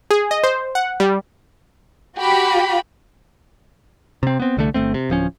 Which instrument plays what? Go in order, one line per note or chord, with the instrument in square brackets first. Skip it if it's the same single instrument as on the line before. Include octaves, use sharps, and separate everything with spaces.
[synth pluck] G#4
D#5
C5
F#5
G3
[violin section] F#4 G4 B5
[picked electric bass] C3 C4
B3 C4
C2 D3 A3
G1 F#2 A3 C4
C3
D1 F3 C#4